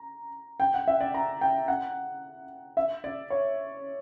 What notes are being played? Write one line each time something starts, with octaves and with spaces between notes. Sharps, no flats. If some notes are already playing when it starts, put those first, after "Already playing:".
Already playing: A#5
G5
F#5
E5
D5
A#5
G5
F#5
E5
D5
C#5